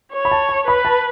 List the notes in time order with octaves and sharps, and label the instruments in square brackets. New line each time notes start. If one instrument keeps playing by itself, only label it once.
[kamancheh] C#5
[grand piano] B5
A5
A5
[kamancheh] B4 [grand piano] B5
[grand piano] A5